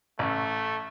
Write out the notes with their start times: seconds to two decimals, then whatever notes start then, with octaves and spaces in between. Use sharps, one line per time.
0.19 A1 A3